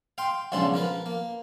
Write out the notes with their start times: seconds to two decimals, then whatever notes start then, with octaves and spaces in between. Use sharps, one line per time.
0.18 F5 G5 C6
0.52 B1 G#2 C#3 F3 D4 C6
0.74 F3 A#4 B4
1.06 A#3